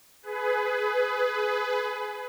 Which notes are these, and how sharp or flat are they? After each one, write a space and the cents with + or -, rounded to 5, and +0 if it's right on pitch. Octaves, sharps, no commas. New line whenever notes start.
G#4 +20 B4 +20